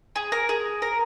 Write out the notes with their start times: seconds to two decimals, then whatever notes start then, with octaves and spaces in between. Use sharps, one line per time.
0.16 G#4
0.32 A#4
0.49 G#4
0.82 A#4